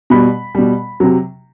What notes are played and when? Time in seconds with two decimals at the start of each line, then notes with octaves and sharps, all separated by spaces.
0.10 B2 G3 B5
0.55 B2 G3
1.00 C3 F#3